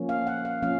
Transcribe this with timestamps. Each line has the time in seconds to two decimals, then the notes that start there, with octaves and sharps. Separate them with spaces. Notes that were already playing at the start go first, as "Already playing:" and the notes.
Already playing: F3 A#3 C#4
0.09 F5
0.27 F#5
0.45 F5
0.62 F3 A#3 C#4 F5